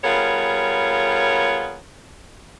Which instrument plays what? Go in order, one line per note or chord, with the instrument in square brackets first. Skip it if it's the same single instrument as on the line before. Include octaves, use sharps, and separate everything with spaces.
[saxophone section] G3 B3 F4 G#4 A#4 C#5